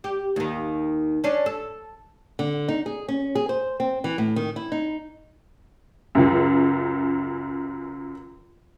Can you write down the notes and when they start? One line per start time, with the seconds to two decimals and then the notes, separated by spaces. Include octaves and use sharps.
0.04 G4
0.36 D#2 D#3
1.24 C#4 D4
1.46 A4
2.39 D3
2.69 D#4
2.86 G#4
3.08 C#4
3.35 G#4
3.49 C5
3.80 C4
4.04 E3
4.18 A2
4.36 D#3
4.56 E4
4.72 D#4
6.15 C#2 F#2